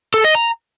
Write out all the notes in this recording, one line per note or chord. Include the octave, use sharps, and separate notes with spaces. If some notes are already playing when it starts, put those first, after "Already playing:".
A4
D#5
A#5